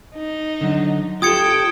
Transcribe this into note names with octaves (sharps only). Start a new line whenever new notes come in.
D#4
D3 F#3
F4 G4 A4 G5 D#6 G#6 C#7